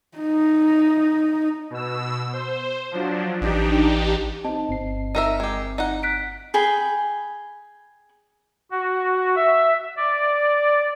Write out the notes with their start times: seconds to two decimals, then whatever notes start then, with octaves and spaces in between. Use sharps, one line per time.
0.18 D#4
1.70 B2 E6
2.33 C5
2.91 F3 F#3 D4
3.41 A1 D4 D#4 G4
4.45 C4 D#4 D#5 A5
4.69 G1 C4 C7
5.15 D#4 A#4 E5
5.40 G#3 G4
5.78 D#4 F#5
6.03 F#6 B6 D7
6.54 G#4 G5 B5
8.71 F#4
9.36 E5
9.96 D5